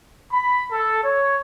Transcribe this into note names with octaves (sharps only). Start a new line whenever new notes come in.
B5
A4
C#5